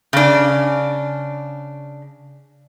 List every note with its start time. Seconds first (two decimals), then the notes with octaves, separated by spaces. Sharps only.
0.13 C#3 D4